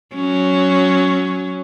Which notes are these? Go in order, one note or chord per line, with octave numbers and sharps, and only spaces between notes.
F#3 C#4